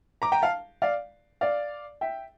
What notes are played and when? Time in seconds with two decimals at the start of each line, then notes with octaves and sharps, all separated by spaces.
0.22 A#5 D6
0.32 G5 A#5
0.42 F5 A5
0.82 D5 F5
1.41 D5 F5
2.01 E5 G5